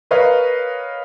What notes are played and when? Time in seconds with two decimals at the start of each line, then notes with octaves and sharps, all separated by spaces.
0.11 A#4 B4 C#5 D#5 F5